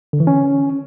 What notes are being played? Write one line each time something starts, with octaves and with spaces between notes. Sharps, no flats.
D3
E3
C#4